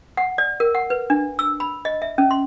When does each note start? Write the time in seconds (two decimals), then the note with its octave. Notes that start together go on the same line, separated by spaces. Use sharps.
0.17 F#5
0.38 D5
0.60 A#4
0.75 F#5
0.90 B4
1.10 D4
1.39 E6
1.60 B5
1.85 D#5
2.02 E5
2.18 C#4
2.31 C6